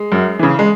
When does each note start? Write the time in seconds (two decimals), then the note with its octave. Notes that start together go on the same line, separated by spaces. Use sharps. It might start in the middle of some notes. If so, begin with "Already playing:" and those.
Already playing: G#3
0.12 F#2
0.39 C#3 E3
0.59 G#3